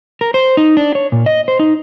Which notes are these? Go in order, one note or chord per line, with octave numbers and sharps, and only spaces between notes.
A#4
C5
D#4
D4
C#5
A#2
D#5
C5
D#4